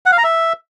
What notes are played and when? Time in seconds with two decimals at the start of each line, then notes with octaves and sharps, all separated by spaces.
0.06 F#5
0.12 F5
0.18 A#5
0.24 E5